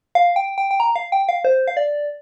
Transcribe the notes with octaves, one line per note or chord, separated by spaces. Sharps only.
F5
G5
G5
G5
A#5
F5
G5
F5
C5
F5
D5